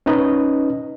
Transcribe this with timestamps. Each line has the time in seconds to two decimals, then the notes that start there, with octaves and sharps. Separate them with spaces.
0.06 C#4 D#4 B4 D#5